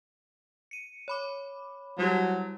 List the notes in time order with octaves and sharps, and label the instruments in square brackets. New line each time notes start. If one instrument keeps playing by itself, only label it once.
[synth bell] C#7 D#7
C#5 B5 D6
[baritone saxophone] F#3 [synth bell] G3 E4 G4